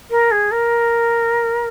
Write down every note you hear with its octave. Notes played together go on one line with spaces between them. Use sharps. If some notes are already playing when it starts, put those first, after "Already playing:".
A#4
G#4
A#4